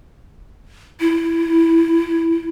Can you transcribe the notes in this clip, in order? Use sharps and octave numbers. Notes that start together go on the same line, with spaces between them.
E4